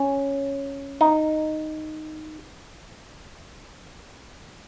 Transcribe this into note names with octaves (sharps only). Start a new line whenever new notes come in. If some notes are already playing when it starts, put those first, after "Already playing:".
Already playing: C#4
D#4